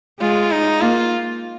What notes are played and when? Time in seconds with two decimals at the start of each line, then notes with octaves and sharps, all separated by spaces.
0.20 G#3 F4
0.51 D#4
0.81 A#3 F4